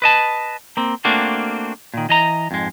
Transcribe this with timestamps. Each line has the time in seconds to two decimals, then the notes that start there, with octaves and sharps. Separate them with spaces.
0.02 B4 D#5 A5
0.77 A#3 C4
1.05 A3 A#3 C4 D4 F#4
1.94 A#2 D#3
2.09 E3 D#5 A#5
2.51 F2 G#2 G#3